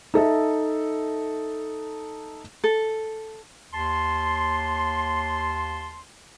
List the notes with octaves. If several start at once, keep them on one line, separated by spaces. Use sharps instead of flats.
D#4 A4 E5
A4
D#2 A5 C6